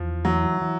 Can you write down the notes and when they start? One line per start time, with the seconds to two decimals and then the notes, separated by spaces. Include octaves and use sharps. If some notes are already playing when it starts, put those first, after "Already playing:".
Already playing: E2 F3
0.25 E3 F#3
0.62 E3